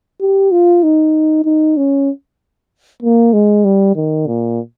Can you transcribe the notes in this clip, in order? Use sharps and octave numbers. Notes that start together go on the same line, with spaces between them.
G4
F4
D#4
D#4
C#4
A#3
G#3
G3
D#3
A#2